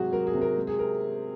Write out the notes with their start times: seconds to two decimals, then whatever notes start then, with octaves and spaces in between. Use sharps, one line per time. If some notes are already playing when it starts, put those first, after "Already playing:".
Already playing: G#2 C3 F#3 F#4 G#4
0.12 F#3 A#4
0.27 G#4
0.34 C3
0.42 A#4
0.56 G#3
0.67 G#4
0.79 A#4